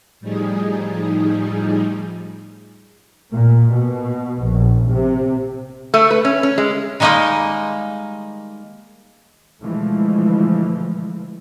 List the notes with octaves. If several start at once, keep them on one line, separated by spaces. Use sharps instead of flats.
A2 F3 G3 D#4 G#4
A#2
B2
A#1
C3
A3
B4
C#4
C#4
G#3
D#3 G3 G#3 A#3 D#4 D#5
B2 D3 E3 F3 G#3 A3